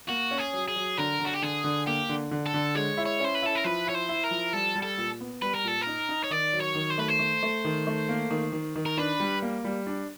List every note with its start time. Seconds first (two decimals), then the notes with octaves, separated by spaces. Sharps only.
0.09 A#3 F#4
0.31 C#4
0.39 G#4
0.53 F#3
0.68 G#4
0.76 F#3
0.98 D3 A#4
1.20 D3
1.25 F#4
1.34 G4
1.42 D3 G#4
1.64 D3
1.87 A#3 G4
2.09 D3
2.31 D3
2.46 A4
2.54 D3
2.75 G#3 C#5
2.97 E4
3.06 C#5
3.20 C#4 C5
3.35 B4
3.42 E4 A4
3.55 A#4
3.64 F3 B4
3.87 E4 C#5
3.94 C5
4.09 E4
4.24 A#4
4.31 F3
4.53 G3 A4
4.75 G3
4.82 A4
4.98 A#2
5.21 B3
5.42 G3 B4
5.55 A#4
5.64 A#2 A4
5.81 A#4
5.87 D#4
6.09 D#4
6.24 C#5
6.30 D#3 D5
6.53 F#3
6.60 C#5
6.75 D#3
6.90 C5
6.98 A3 B4
7.08 C5
7.19 A3
7.43 A3
7.65 D#3
7.87 A3
8.09 A#3
8.31 D#3
8.53 D#3
8.75 D#3
8.86 A#4
8.97 D4 B4
9.20 G3
9.42 A#3
9.64 G3
9.87 D4